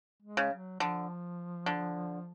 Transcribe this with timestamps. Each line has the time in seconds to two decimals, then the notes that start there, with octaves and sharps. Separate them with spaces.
0.22 G#3
0.37 C#3
0.51 F#3
0.80 D3 F3
1.66 D3